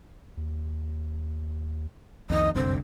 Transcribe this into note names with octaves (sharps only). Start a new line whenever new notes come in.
D#2
C2 F2 D3 D#3 D#5
F1 C2 F#2 D3 C4